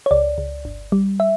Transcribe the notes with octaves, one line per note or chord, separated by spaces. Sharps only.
C#5
C#2 D5
C#2
G1
G3
E5